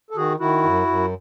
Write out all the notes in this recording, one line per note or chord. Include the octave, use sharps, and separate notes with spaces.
A4
D#3 F#4 G#4
D#3 E4 F#4
F#2
F#2